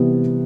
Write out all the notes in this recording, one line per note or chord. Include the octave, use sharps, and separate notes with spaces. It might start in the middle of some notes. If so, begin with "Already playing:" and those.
Already playing: C3 E3 G3 B3